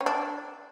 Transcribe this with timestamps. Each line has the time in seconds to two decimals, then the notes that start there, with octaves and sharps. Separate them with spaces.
0.01 C#4
0.06 D4